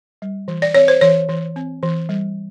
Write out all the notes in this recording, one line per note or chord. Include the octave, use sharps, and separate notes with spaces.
G3
E3
D5
C4 C#5
C5
E3 C#5
E3
C4
E3
G3